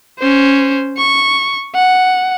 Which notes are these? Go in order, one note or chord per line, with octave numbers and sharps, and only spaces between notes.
C#4 C5
C#6
F#5